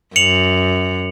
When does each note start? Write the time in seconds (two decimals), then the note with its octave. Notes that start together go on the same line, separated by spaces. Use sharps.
0.16 F#2 C#7 F7 F#7